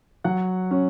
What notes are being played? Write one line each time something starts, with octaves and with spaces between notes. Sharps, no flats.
F#3 F#5
C#4